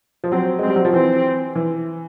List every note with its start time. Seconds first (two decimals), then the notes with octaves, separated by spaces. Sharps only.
0.24 F3
0.32 F#3 C4
0.59 G#3
0.63 C4
0.67 G3
0.76 F#3
0.85 F3
0.93 E3 C4
1.55 E3